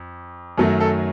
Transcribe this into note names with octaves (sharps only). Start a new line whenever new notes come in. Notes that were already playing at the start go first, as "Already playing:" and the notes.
Already playing: F2
F#2 D#3 F#3 A3 A4
A4